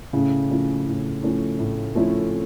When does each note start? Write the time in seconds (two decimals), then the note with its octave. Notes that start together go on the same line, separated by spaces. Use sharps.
0.13 A2 C#3
0.50 F3 A3 C#4 E4
0.87 A2
1.23 F3 A3 C#4 E4
1.59 A2
1.95 F3 A3 C#4 E4